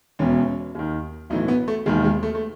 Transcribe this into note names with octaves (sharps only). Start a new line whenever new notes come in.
E1 E2 B2 C#4
D#2 D#3
B1 A2 E3 D#4
B3
A3
E1 D#2 D#3 G#3
G#3
A3
A3